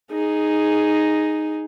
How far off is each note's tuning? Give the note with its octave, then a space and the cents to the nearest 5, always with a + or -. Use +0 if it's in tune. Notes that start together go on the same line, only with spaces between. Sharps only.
D#4 +0 G#4 +5